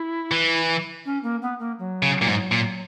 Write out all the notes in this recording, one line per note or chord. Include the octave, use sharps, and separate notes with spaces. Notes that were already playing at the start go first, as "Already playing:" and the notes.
Already playing: E4
E3
C#4
A#3
B3
A#3
F#3
C#3
A#2
G#2
A#2